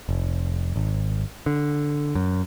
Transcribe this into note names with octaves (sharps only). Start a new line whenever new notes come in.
F1
G#1
D3
F#2